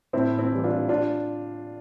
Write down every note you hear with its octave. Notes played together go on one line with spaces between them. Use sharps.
A2 C4 E4
C4 E4
E3 G3
D4 F4
D4 F4